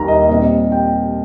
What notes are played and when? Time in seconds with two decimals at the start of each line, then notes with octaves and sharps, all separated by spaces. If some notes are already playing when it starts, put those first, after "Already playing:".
Already playing: D#2 D#3 G3 A#5
0.08 D#5
0.29 A#2 G3 C4 D#5
0.72 G5